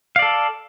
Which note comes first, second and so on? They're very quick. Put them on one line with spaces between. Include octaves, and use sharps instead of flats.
F5 D5 A4